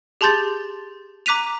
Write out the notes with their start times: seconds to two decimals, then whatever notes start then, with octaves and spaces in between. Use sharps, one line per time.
0.21 G4 G#4 A5 C6 G6 A6
1.26 A#5 D6 F#6 B6 D#7 F7